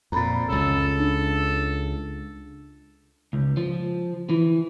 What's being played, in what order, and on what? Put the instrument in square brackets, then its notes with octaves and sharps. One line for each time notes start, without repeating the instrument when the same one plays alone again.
[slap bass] F2 A#2 [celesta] A#5 B5 A6
[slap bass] C#2 C#3 [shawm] A4
[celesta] D4
[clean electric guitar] C#2
F3
E3